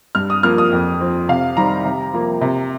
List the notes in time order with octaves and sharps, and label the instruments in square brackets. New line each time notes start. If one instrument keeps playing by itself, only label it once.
[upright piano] G2 F6
D#6
F3 A#3 F6
D#6
F2
F3 C4
C3 F5
D#3 G3 C4 A#5
C3
F3 A#3
C3